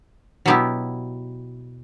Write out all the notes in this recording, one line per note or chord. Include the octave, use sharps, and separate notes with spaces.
B2 F#3 B3 E4 G4